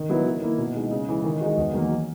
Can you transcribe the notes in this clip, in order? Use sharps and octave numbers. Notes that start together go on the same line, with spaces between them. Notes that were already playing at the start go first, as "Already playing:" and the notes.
Already playing: D#3
F#3 B3 E4
D#3
A#3 E4
B2
G#3 D#4
C#3
E3 G#3
D#3
G#3 D#4 F#4
E2
D#3 F#3 A#3